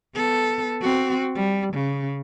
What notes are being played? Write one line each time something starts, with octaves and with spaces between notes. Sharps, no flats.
B3 A4
C4 F#4
G3
C#3